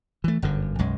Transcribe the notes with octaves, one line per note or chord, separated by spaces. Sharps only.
E3 A3
G1 F#2 D3
B1 F#2 G#3